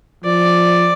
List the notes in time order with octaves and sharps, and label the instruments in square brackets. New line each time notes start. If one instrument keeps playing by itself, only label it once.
[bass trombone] F3 [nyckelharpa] D5